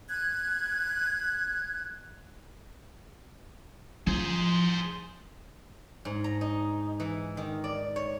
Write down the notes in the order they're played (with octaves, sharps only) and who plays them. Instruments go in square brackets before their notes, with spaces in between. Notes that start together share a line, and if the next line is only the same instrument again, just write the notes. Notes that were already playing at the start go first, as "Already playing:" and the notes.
[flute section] F#6 G#6
[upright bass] F3 [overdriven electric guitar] G#4 C5
[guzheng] G#2
A#5
D#4
E3
D#3
D5
C#5